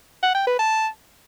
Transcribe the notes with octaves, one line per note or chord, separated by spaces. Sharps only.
F#5
G5
B4
A5